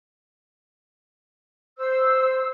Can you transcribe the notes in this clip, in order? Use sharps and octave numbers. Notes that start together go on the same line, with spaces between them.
C5 E6